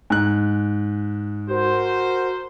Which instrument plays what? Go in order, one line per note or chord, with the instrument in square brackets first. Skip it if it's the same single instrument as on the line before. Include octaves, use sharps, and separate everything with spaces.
[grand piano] G#2 F#6
[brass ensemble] F#4 A#4 C5